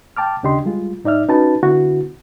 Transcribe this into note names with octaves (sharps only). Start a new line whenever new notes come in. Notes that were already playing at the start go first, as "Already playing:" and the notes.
G5 A5 D6 F6
D#2 C#3 D4 G4 D#5 C6
G3 G#3 F4
G#2 D#4 D5 E5 F6
C#4 D#4 F#4 B4 A5
D3 B3 E4 F#4